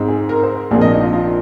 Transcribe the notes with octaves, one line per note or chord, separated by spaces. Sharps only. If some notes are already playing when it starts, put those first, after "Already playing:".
Already playing: G#2 G#3 C4
G#4
A#4
C5
A#1 A#2 F3 C4 G#4
D#5
D#4
F4
F4